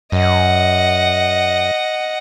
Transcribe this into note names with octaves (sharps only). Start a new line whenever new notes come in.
F#2 D#5 F#5